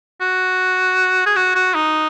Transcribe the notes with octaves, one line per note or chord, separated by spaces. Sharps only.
F#4
G#4
F#4
F#4
D#4